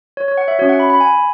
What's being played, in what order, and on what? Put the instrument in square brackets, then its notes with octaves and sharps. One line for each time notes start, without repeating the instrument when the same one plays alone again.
[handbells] C#5
C#5
F#5
E5
C#4 F#4 C#5
F#5
B5
B5
G#5